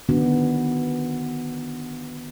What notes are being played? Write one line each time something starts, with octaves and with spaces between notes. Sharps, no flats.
D3 D#3 B3 D4 F#4